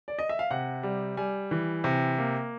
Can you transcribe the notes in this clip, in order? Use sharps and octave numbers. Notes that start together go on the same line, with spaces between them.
D5
D#5
E5
F5
C3 F#5
G3
G3 G#5
E3
C3
A#3